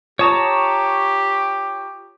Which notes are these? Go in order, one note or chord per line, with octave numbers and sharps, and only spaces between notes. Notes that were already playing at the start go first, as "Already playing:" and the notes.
F4 G4 C#5 A5 A#5 C#6 D#6